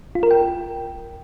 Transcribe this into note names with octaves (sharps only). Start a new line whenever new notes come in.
F4
A#4
G5